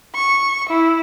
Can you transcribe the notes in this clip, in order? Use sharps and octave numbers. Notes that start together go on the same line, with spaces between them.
C#6
E4